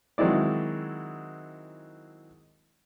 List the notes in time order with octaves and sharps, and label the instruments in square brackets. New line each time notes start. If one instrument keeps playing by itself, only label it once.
[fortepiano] D#3 F#3 G#3 C4 E4 D5